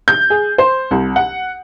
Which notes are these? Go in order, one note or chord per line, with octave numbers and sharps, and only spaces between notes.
G6
G#4
C5
C2
F#5